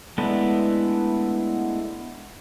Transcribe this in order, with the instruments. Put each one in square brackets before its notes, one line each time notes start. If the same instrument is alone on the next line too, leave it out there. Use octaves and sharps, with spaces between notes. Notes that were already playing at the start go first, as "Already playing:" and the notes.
[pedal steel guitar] G#3 A3 B3 D4 E4